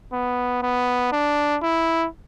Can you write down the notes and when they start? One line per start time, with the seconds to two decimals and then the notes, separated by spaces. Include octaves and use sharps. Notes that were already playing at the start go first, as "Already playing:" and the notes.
0.13 B3
0.63 B3
1.12 D4
1.63 E4